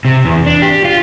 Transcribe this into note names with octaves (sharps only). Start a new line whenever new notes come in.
C3
E2
D4
G4
F4